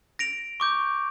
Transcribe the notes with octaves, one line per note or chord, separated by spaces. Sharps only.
A#6 D7 F7
C#6 D6 G6